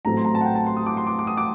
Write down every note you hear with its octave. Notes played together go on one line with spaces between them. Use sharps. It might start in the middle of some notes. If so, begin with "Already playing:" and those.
A1 A2 F#3 A3 C4 A#5
C6
A#5
A5
F#5
G5
A5
C6
D#6
D6
C6
D6
D6
D#6
D6